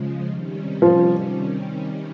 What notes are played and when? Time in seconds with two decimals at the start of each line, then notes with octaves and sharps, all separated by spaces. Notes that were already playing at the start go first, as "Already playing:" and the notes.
Already playing: C#3 F3 G#3
0.26 C3 D#3 G3 C#4
0.82 F3